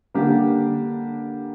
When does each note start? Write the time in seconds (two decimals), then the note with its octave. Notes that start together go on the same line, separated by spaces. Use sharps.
0.14 D3 G3 A#3 D4 G4